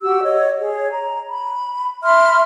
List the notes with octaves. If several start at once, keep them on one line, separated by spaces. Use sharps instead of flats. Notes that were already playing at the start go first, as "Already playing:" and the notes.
F#4 G4 E6
C#5 D#5
G#4 C#5
A#5
B5
E5 B5 C6 F6